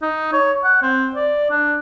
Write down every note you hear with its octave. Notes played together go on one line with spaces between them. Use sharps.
D#4
C#5
F#5
C4
D5
D4